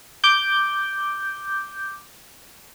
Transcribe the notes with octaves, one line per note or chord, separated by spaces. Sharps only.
D6 G6